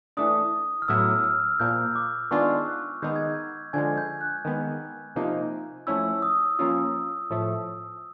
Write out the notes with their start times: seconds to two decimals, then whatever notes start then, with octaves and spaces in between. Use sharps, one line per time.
0.17 E3 A3 D4 D#6
0.82 F6
0.88 A2 F#3 B3 E4 E6
1.24 F6
1.60 A#2 F3 A#3 G6
1.96 D6
2.31 D#3 G#3 B3 D4 F4 C#6
2.67 F#6
3.02 D#3 G#3 B3 D#4 G6
3.16 G#6
3.30 G6
3.73 D3 F3 G#3 G#5 G#6
3.98 G6
4.21 F#6
4.45 D#3 G#3 B3
5.16 C3 F3 A#3 D#4
5.87 F3 A3 C#4 E4 E6
6.22 D#6
6.59 F3 A#3 C#4 F4
7.30 A2 F3 A3